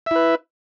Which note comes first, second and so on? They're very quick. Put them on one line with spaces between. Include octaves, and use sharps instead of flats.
E5 E4 B4